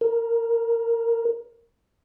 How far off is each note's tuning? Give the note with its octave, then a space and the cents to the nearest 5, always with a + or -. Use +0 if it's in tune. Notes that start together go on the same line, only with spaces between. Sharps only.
A#4 +0